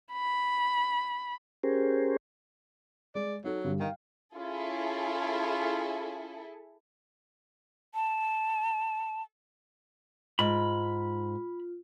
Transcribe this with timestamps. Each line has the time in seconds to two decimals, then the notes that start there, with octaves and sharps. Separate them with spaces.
0.12 B5
1.63 C#4 G4 G#4 A#4 C5
3.15 G#3 D5
3.44 F#3 D#4 A4
3.64 G2 D3
3.80 D#3 F5 G5
4.34 C#4 E4 F4 G#4 A4
7.95 A5
10.39 G#2 F4 B5